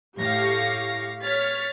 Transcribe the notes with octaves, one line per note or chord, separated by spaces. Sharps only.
A2 G4 F5 C#6 A#6
C#5 F6 A6 B6